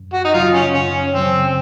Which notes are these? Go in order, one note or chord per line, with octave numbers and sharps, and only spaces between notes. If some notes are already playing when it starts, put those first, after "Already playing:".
Already playing: F#2
F#4
D#4
C#3 F#3 F4
C#4
F#2 C#4
C#3 F#3 C4